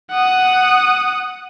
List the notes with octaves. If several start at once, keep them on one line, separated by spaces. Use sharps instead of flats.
F#5 D#6